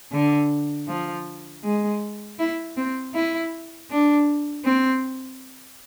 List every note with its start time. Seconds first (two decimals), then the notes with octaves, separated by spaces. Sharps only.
0.12 D3
0.88 F3
1.64 G#3
2.39 E4
2.77 C4
3.14 E4
3.90 D4
4.65 C4